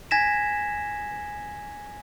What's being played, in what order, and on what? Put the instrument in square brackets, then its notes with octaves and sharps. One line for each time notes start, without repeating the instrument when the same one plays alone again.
[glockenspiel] G#5 G#6 A#6 B6 E7